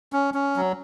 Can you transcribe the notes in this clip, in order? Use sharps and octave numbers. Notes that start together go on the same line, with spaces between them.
C#4
C#4
F#3